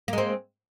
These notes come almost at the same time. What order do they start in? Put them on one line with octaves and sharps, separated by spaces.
A#3 G#3 C4